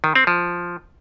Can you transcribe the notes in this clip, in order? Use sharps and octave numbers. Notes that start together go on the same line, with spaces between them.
D#3
C4
F3